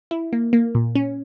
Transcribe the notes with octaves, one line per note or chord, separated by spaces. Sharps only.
E4
A#3
A#3
A#2
C#4